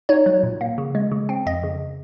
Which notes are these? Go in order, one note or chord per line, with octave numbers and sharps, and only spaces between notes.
D#4 C#5
F#3
A#2
A#3
C#3
G#3
C#3
C4
F2 D#5
C#3